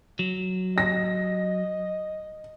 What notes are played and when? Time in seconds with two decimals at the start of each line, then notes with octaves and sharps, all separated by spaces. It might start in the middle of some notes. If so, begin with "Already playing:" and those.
0.19 F#3
0.78 D#5 A#6